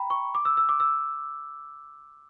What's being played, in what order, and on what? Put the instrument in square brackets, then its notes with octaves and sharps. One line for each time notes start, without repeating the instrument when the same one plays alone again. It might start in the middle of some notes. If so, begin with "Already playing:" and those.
Already playing: [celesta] G5 A#5 B5
C#6
D6
E6
E6
D6
E6